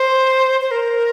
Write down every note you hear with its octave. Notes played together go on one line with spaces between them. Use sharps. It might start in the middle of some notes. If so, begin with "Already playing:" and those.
Already playing: C5
C5
A#4